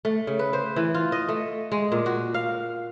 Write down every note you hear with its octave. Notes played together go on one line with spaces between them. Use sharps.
A3
C#3
B4
C5
E3
F4
D#5
A3
G#3
A#2
F#4
F5